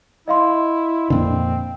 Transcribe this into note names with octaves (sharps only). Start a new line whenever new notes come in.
E4 D#5 F5 C6
F2 A#2 D3 C4